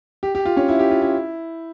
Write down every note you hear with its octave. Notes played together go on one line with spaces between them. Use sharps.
G4
G4
F4
C#4
E4
G4
F4
E4